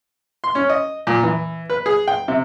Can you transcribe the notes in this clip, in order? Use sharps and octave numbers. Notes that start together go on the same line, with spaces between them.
C6
C#4
D#5
A#2
E3
B4
G#4
G5
C3